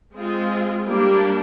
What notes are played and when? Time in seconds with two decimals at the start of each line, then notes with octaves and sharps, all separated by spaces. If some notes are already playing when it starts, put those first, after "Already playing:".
0.13 G#3 C4 F4 G#4
0.84 G3 A#3 D4